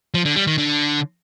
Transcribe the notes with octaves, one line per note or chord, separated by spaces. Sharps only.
F3
D3
G3
D#3
D3